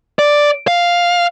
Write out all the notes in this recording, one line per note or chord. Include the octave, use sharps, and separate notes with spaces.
D5
F5